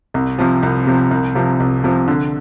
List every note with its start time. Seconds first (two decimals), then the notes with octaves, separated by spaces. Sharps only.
0.14 C2
0.39 C3 F3
0.63 C2
0.87 C3 F3
1.11 C2
1.35 C3 F3
1.60 C2
1.84 C3 F3
2.08 D3